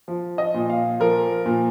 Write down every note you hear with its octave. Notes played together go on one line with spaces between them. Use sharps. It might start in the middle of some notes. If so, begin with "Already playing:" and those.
F3
D#5
A#2
F5
F3 A#4
A#2